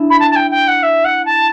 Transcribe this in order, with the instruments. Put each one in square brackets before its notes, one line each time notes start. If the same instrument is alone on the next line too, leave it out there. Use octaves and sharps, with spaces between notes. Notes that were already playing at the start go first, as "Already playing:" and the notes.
Already playing: [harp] D4 E4
[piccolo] B5
A5
A5
G5
G5
F#5
E5
F#5
A5